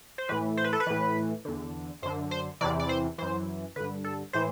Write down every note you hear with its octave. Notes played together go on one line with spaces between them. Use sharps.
C5
A2 E3 B4
C5
B4
A4
B4
A2 E3
E2 D3
F#2 D3 C5
C5
E2 C3 E3 D5
D5
C5
F#2 E3 C5
G2 D3 B4
A4
A2 E3 C5